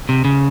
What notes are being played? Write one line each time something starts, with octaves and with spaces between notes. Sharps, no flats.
C3
C#3